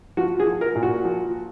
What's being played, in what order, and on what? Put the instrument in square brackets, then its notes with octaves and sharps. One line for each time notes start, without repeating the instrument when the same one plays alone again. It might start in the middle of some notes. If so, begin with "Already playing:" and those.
[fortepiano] F3 F#4
G#4
F3
A#4
A#2
F#4
F3